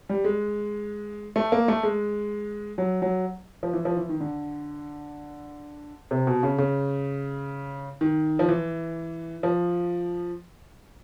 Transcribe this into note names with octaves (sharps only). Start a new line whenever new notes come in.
G3
G#3
A3
A#3
A3
G#3
F#3
F#3
F3
E3
F3
E3
D#3
D3
C3
B2
C#3
C#3
D#3
F3
E3
F3